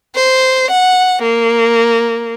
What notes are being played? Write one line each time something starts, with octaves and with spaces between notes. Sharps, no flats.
C5
F#5
A#3